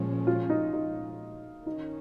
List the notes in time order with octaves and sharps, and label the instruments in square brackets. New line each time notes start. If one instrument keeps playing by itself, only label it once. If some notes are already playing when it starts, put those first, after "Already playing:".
Already playing: [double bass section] A#2 F3 G#3 C#4
[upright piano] F4
D#4
D#4
[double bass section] D#3 C#4 [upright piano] D#4